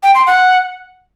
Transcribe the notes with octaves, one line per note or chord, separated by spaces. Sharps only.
G5
C6
F#5